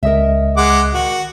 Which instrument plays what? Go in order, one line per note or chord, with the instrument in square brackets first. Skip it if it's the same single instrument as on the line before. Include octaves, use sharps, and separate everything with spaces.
[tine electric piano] C#2 D#5 [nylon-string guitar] A#4 E5
[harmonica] G#3 F#5 D6
[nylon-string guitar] D#3 [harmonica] F#4